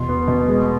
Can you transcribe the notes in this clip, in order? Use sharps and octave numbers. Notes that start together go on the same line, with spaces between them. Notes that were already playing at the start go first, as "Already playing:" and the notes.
Already playing: E2 B2 C6
B3
B2
G#3